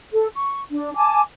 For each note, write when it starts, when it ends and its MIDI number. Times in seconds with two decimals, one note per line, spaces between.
0.13 0.27 69
0.34 0.60 85
0.70 0.91 62
0.96 1.21 80
0.96 1.21 81
0.96 1.21 86